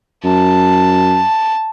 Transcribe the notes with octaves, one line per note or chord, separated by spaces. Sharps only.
F#2 A5